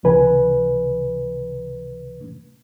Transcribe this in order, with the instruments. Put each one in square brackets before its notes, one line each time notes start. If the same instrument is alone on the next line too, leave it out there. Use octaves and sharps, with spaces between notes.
[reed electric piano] C#2 C3 E3 B4 G#5